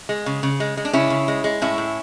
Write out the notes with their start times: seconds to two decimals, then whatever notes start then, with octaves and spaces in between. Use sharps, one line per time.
0.09 G#3
0.26 C#3
0.43 C#3
0.60 G#3
0.77 G#3
0.85 D4
0.93 C#3 C#4 E4
1.10 C#3
1.28 G#3
1.44 G#3
1.62 A2 C#4 E4
1.78 A2